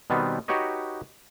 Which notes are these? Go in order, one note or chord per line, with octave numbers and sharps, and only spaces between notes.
B2 D#3 G3 B3 C4
D#4 F#4 G4 B4 C#5 D#5